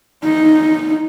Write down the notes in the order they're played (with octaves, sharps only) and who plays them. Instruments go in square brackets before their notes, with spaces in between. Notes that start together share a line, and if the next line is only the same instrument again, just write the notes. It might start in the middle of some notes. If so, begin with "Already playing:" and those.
[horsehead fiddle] D#4